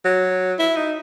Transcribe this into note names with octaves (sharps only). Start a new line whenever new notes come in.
F#3
E4
D#4